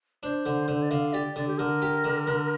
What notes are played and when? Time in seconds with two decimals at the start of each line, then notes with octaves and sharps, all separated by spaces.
0.23 D4 C5
0.46 D3
0.68 D3
0.82 D5
0.91 D3 F5
1.13 G4 D5
1.36 D3 D5
1.47 G4
1.58 D3 A#4
1.82 G4
2.04 D3
2.27 D3